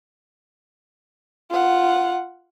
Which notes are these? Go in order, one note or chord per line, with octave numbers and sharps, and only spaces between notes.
F4 F#5